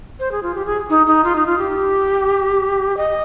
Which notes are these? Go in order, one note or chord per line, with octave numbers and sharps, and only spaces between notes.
C5
G#4
F4
G4
G#4
D#4
D#4
F4
D#4
F4
G4
D#5